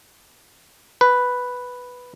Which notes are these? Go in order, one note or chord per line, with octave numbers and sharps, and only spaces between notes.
B4